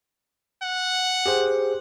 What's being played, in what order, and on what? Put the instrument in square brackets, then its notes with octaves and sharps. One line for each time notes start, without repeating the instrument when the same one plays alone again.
[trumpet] F#5
[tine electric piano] G4 G#4 C5